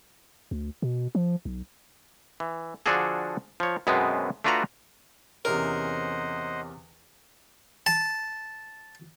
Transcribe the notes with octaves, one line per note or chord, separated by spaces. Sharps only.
D2
B2
F3
B1
E3
D3 F3 D4 F#4 G#4 A4
F3 C#5
F#2 B2 G#3 B3 C4
A3 D4 F4 F#4 B4 A#5
E2 C3 C#4 A#4 C5 D#5 F#5
A5